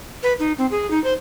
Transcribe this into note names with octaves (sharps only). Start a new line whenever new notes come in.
B4
D#4
C4
G#4
D#4
C5